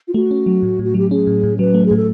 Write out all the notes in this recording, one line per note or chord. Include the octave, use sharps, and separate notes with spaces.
F4
A3 F#4
C#4
F#3
A2
A2 F#4
F#3 G4
C#4 G#4
A2
A2
F#3 B4
A3
G#4
A2
A4